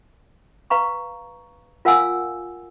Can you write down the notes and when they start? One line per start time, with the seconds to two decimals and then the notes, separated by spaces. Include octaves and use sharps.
0.70 B4 F5 A#5 C#6
1.85 F4 A#4 F5 F#5 G#5 E6